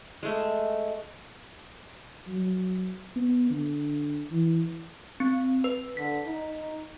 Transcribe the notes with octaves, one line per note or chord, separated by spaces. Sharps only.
G#3 A3
F#3
B3
D3
E3
C4
B4
D3 B6
D#4